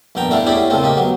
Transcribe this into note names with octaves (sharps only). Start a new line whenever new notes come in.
A#1 G2 B3 G5 A#5
A3 B3 D4 E4 D5 F5
C#4 E4 G4 G#4 D5
A#2 C#3 A3 C4 F4
A#3 G4 D#5
F#3 B3